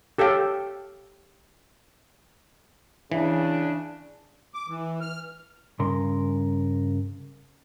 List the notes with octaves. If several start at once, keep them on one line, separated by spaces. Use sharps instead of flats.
G4 A4 C#5 F5 G5
C#3 E3 D4
D6
E3
F6
G2 C#3 A#4 C6